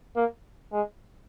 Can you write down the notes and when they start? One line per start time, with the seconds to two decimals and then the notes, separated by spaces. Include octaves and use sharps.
0.16 A#3
0.73 G#3